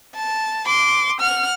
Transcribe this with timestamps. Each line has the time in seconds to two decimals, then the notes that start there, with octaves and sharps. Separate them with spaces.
0.15 A5
0.67 C6 D6
1.20 F#5 F6